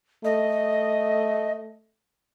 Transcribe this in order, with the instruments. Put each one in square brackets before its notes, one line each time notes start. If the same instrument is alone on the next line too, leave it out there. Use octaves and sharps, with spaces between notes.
[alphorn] A3 [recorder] D#5